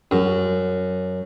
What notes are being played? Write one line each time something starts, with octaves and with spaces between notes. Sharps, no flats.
F#2